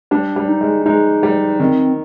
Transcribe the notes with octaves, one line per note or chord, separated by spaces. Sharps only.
G3 D4
G3
D#4
G#3
G#3 D#4
G3
D#3 C4